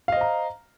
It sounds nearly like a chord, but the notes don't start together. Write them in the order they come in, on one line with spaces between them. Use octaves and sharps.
F5 D#5 C5 A#5